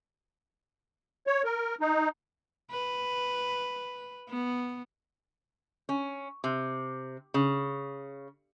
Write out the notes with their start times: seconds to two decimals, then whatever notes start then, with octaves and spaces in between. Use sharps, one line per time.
1.27 C#5
1.44 A#4
1.81 D#4
2.71 B4
4.29 B3
5.89 C#4
6.44 C3
7.34 C#3